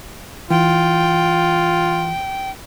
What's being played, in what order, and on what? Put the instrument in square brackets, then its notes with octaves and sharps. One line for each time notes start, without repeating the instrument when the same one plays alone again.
[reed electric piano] E3 [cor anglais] F4 [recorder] G5